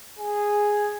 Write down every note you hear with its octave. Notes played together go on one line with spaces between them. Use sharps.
G#4